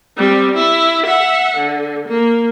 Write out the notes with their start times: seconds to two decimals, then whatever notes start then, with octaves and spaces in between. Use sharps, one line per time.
0.17 G3 C4
0.54 E4
1.06 E5 F#5
1.57 D3
2.08 A#3